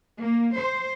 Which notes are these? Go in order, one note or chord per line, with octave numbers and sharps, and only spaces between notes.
A#3
C5